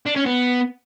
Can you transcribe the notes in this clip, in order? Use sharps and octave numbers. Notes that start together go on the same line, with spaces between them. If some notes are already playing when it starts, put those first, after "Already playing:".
D4
C#4
B3